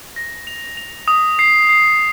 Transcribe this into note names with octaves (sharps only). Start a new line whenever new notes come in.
A#6
F7
F7
D#6
C7
C7